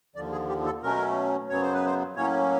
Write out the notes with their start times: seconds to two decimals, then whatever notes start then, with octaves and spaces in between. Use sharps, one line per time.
0.15 D#2 D3 F3 D5
0.32 G#4
0.49 G4
0.66 A4
0.82 B2 F#3 A3 C#4 A#4
1.49 F#2 C#3 F#3 B3 C#5
1.62 C5
1.74 B4
1.85 C5
2.16 A2 F#3 A#3 C#4 C#5